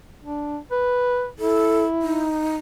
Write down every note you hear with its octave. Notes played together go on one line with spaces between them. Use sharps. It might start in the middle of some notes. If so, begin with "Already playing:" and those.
D4
B4
E4 A4
D#4